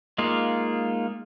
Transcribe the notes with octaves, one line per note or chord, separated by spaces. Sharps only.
G#3 A#3 D#4 F4